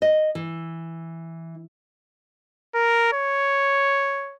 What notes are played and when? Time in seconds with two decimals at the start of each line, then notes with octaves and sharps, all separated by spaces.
0.02 D#5
0.35 E3
2.75 A#4
3.13 C#5